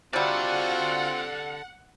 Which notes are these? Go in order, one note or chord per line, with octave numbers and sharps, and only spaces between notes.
C3 G3 C4 F4 F#4 A4 D5 F#5